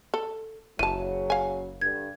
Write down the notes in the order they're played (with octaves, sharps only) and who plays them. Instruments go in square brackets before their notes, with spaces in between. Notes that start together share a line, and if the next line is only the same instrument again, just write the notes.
[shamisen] A4
[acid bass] F#1 [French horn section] C#3 F#3 [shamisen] E3 A5 [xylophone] D#7
[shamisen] F5 G#5
[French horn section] G2 D3 [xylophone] G#6